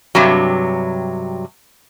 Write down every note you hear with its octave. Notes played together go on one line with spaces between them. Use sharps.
G2 C3 F#3